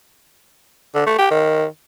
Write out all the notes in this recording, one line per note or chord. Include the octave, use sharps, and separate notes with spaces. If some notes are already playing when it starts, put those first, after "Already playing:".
D3
A3
G4
D#3